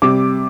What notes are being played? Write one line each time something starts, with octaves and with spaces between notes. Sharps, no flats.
C3 G3 D6